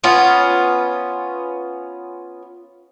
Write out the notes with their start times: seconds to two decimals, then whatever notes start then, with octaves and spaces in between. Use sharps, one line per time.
0.04 B3 C#4 F4